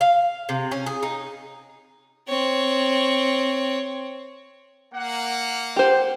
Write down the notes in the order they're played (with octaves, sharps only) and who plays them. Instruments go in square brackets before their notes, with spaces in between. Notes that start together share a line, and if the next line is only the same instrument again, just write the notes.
[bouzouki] F5
C3
C#4
G#4
D#4
[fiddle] C4 C#5
[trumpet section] A#3 F#5
[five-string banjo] G4 C5